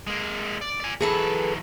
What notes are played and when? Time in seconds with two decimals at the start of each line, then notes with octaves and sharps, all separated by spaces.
0.07 G#3 A#3
0.61 D5
0.80 D5 G#5
1.01 E3 F#3 G#4 A4 B4